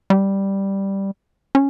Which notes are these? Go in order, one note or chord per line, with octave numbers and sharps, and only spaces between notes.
G3
C#4